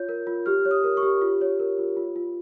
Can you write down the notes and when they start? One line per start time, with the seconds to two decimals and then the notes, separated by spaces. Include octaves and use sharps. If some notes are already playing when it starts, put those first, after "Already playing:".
Already playing: F4 C#5 G6
0.09 A#4
0.27 F4
0.46 G4 F6
0.65 C#5
0.71 D#6
0.84 A#4
0.97 C#6
1.03 G4
1.22 F4
1.41 C#5
1.60 A#4
1.78 F4
1.97 F4
2.16 F4